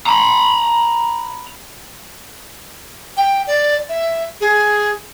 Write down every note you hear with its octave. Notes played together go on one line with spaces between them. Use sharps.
A#5 B5
G5
D5
E5
G#4